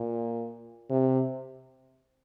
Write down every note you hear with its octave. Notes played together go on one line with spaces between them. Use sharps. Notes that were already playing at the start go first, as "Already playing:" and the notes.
Already playing: A#2
C3